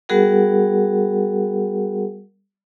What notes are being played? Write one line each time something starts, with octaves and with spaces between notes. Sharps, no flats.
G3 B3 F#4 G#4 A#4 F#5